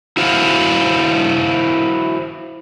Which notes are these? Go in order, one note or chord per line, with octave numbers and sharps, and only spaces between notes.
E4 F#4 C5 F5